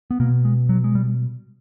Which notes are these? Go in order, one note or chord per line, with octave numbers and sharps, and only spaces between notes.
B3
B2 A#3
G#3
F#3
G#3
G3